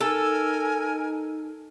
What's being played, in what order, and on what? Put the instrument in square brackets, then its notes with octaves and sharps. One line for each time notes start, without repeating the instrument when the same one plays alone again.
[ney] D#4 [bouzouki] A4 [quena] A#4 [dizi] G#5